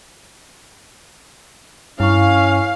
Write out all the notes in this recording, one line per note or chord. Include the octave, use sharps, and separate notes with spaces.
G2 C#4 E4 F5 C#6